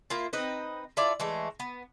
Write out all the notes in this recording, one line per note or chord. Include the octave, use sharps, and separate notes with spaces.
A#3 E4 F4
C4 D#4 B4 D#5
E4 F4 A4 D5
E3 G#3 A3
B3